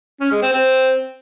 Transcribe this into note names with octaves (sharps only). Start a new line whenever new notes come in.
C#4
G#3
C4
C4